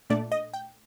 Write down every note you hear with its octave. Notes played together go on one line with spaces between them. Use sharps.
A#2 A3 D4 D5
D#5
G5